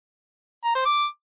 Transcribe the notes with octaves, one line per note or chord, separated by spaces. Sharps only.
A#5
C5
D6